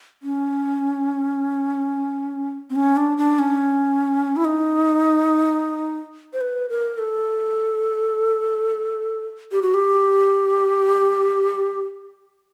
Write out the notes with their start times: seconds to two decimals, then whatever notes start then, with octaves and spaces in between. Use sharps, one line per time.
0.23 C#4
2.70 C4
2.76 C#4
2.97 D4
3.17 D4
3.39 C#4
4.36 E4
4.45 D#4
6.33 C5
6.41 B4
6.69 A#4
6.98 A4
9.52 G4
9.62 F#4
9.74 G4